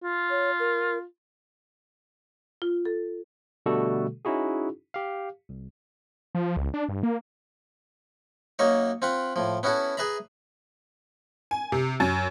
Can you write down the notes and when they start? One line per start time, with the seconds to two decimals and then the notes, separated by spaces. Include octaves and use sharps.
0.03 F4
0.30 C#5
0.59 A#4
2.62 F4
2.85 A4
3.66 B2 D3 G3 A3 F#4 A4
4.25 C#4 D#4 E4 F#4 G#4
4.94 G4 F5
5.49 C2
6.35 F3
6.57 C#2
6.74 D4
6.89 G2
7.03 A#3
8.59 F#2 F#3 A#3 D#4 C#5
9.02 C4 F4 F#5 B5
9.36 A2 F3
9.63 B3 C#4 E4 F#4 A4
9.97 G#4 B4 E5 A#5 B5
11.51 G#5
11.72 C3
12.00 F#2